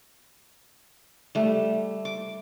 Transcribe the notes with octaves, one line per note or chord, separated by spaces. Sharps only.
G3 A3
D6